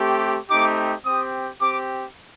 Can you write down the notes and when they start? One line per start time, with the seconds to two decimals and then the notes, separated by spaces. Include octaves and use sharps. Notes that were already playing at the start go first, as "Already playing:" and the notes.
Already playing: A3 C4 G4
0.49 A3 C4 D#4 G4 D6
1.05 C4 G4 D#6
1.61 C4 G4 D6